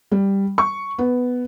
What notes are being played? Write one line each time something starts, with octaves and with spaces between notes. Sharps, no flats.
G3
C#6
B3